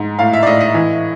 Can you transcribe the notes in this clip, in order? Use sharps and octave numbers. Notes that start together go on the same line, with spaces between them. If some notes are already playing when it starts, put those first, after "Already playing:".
Already playing: G#2
A2 F5
E5
D5
A2 D#5
D#5
E3